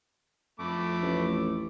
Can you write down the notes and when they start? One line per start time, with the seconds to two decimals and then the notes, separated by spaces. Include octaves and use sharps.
0.59 F2 A3 B5 D6
1.02 A1